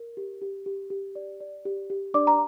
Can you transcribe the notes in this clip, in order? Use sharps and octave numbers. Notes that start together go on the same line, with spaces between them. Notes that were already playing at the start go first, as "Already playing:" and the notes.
Already playing: A#4
G4
G4
G4
G4
D5
D5
G4
G4
D4 D5 D6
A#5